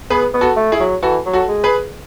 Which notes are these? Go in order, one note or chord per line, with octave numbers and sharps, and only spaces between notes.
B3 G#4 B4
B3
F#4 A4
A3
E4 G#4
F#3
E3 F#4 A4
F#3
F#4 A4
G#3
G#4 B4